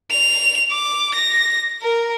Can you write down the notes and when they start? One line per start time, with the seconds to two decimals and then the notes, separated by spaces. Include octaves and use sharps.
0.11 F7
0.71 D6
1.14 A#6
1.82 A#4